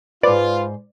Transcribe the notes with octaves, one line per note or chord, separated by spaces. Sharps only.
G#2 F4 B4 C5 D5